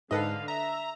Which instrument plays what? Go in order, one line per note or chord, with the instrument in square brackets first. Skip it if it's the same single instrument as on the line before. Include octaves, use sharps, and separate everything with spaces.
[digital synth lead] G#2 [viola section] D3 F5 [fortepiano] A4 B4 D#5
[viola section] E5 [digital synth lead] A#5